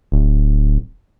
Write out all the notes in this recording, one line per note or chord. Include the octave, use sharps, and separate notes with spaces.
D1